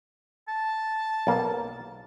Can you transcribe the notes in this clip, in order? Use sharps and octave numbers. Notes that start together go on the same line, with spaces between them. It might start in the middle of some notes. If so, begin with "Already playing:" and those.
A5
B1 A#3